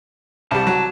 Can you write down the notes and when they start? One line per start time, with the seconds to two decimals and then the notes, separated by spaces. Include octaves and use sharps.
0.51 C2 G3 A5
0.67 F#3